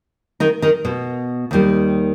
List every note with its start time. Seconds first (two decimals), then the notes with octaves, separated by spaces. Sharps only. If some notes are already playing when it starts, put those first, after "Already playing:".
0.40 D#3 D#4
0.62 D#3 D#4
0.85 B2 B3
1.51 D#2 D#3 G3